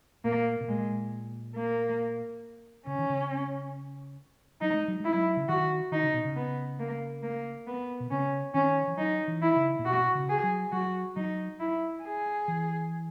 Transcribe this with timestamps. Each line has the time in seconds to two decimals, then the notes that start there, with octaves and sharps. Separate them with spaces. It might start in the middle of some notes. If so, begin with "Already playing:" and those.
0.24 A#2 A#3
0.61 B2
0.68 A#2 G#3
1.56 A#3
2.87 C#3 C#4
2.99 D#3
3.09 C#3
4.61 F#3 D#4
4.74 G#3
4.88 F#3
5.00 G#3 E4
5.14 F#3
5.37 C#3
5.49 D#3 F#4
5.92 D#3 D#4
6.03 C#3
6.13 B2
6.25 C#3
6.36 B3
6.80 A#3
7.23 A#3
7.67 B3
8.00 B2
8.11 C#3 C#4
8.54 D#3 C#4
8.87 E3
8.98 F#3 D#4
9.28 E3
9.42 E4
9.56 C#3
9.79 A#2
9.85 B2 F#4
10.15 C#3
10.29 G#4
10.43 F#3
10.72 F#3 F#4
11.16 F#3 D#4
11.60 E4
12.03 G#4
12.48 E3